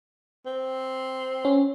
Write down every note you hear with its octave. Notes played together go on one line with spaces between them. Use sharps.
C4
C#4